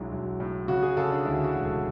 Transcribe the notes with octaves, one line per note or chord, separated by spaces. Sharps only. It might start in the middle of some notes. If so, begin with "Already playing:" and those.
Already playing: B1 F#3 G#3 D4 E4
B1
A2
C#3 F#4
G#4
C#3 A4
D4
D2 E4
F#4
E1
A4